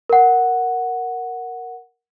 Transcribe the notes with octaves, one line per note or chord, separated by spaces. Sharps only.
A#4 F#5